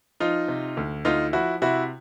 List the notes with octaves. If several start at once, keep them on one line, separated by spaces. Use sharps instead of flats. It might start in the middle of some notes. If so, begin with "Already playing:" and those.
F3 D#4 F4
C3
D2
D2 D#4 F4
F3 E4 F#4
C3 E4 F#4